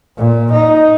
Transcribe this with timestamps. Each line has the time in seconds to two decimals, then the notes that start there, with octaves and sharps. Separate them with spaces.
0.17 A#2
0.52 D#4